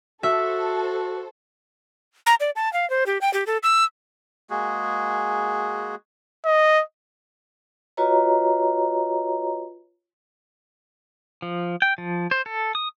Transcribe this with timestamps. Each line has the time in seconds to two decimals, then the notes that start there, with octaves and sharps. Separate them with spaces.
0.23 F#4 A4 C5 E5
2.26 A#5
2.40 D5
2.56 A5
2.73 F5
2.90 C5
3.06 G4
3.21 G5
3.33 G4
3.46 A4
3.63 E6
4.50 G#3 A#3 F#4 G#4
6.45 D#5
7.97 F4 F#4 B4 C#5 D#5 A#5
11.42 F3
11.82 G5
11.98 F3
12.31 C5
12.46 A4
12.75 D#6